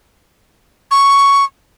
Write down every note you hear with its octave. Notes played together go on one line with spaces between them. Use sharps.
C#6